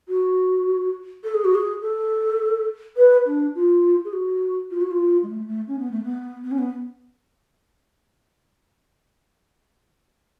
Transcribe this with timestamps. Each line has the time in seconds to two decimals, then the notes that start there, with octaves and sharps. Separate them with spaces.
0.09 F#4
1.24 A4
1.34 G#4
1.45 F#4
1.55 G#4
1.82 A4
2.97 B4
3.26 D4
3.55 F4
4.05 G#4
4.13 F#4
4.71 F4
4.81 F#4
4.91 F4
5.23 G#3
5.29 A3
5.48 A3
5.68 C#4
5.79 B3
5.92 A3
6.04 B3
6.44 B3
6.51 C#4
6.58 B3